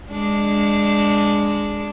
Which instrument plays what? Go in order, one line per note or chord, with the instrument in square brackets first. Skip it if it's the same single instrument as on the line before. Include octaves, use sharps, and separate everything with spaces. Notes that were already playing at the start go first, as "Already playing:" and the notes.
[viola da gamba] G#3 D4